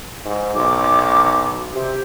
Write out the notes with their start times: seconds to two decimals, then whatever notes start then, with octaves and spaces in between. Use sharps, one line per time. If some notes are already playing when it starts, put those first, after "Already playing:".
0.25 G#2
0.55 B1 D6
1.74 C3 G4